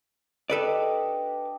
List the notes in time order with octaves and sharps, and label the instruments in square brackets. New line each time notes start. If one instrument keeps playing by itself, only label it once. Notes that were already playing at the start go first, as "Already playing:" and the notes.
[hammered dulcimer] D4 G4 D#5 [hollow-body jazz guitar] A4 B4 D5